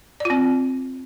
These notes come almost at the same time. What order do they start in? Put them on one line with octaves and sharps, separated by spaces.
D5 F4 C4